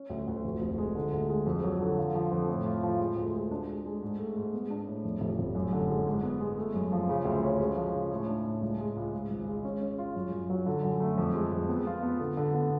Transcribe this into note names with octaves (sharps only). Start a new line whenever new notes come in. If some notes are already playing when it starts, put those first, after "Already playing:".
Already playing: C#4
D2
D2
F1
F1
G#3
D3
D2
G#3
F2
F#3
D3
F3
F3
F2
A2
F4
F3
G#3
D2
G#3
D4
G#3
G#3
G#2
A3
G#2
B3
D4
A2
F2
F1
F1
F#2
D3
G#3
G#2
B3
G#3
A3
F#2
F3
C#3
D2
C#4
G#3
F3
C#3
A2
D4
A2
C#2
G#3
C#2
G#2
G#1
G#3
C#4
C#4
F4
F#2
F#2
F#3
D3
F#2
A3
F2
G#3
F2
B3
F4
B3
D3
D3
B3